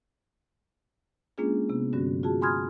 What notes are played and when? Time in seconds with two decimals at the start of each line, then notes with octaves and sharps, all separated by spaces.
1.38 G#3 A#3 C#4 D4 F4 G#4
1.70 C3 B3
1.93 G2 D3 F#3 C#4 F#4
2.23 F4 F#4 G#4 A5
2.41 G#5 B5 C6 D#6 F6 G#6